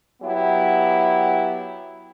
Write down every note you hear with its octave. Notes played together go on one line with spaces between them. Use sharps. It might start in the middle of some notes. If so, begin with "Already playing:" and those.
F#3 B3 E4 G4